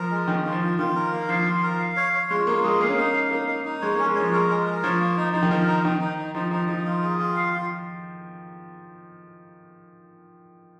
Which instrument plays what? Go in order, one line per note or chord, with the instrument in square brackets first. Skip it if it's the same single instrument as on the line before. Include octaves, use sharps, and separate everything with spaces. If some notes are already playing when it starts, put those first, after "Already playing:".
Already playing: [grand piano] F3 [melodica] A#4
[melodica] G#3
[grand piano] D#3 [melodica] C#4
[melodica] F4
[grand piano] F3
[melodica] F4
[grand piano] D#3 [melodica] F4
[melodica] A#4
A#3
[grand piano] F3 [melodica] F5
[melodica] F4
A#4
F5
C#5
C#5
[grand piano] G#3 [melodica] F4
[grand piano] A#3 [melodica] F4
[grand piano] G#3 [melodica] G#4
[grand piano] A#3 [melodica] F5
[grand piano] C#4
[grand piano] A#3 [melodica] D#4
[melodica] F5
[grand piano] A#3 [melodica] D#4
[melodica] D#4
D#4
[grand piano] G#3 [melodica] C#5
[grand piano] A#3
[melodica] C#4
[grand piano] G#3
[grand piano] F3 [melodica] C#5
[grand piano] G#3 [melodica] A#4
[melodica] G#3
A#4
[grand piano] F3 [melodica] C#5
[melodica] A#3
D#4
[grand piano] F3 [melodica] D#4
[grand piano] D#3
[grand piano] F3 [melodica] A#4
[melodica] D#4
[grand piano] D#3 [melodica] D#4
[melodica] D#4
D#4
[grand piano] F3 [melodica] D#4
[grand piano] F3 [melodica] D#4
[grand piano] F3 [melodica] D#4
[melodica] F4
G#4
F4
F5
F4